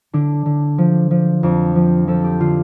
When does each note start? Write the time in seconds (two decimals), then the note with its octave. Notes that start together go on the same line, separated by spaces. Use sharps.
0.13 D3 D4
0.46 D3
0.78 F3
1.11 F3
1.43 F2 D4
1.75 F3
2.07 F3 A4
2.24 G4
2.40 D3 F4